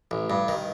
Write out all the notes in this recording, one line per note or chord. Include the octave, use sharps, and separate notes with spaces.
A1
G2
D#3